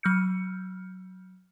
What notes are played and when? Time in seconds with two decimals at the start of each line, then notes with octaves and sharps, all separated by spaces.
0.03 F#3 F6 G6 C#7